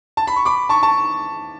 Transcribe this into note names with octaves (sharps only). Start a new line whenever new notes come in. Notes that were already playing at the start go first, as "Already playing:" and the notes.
A5
B5
C#6
B5 D6
A5 C#6
A5